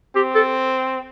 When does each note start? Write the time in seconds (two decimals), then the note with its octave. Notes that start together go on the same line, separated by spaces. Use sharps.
0.16 C4 G4
0.35 A4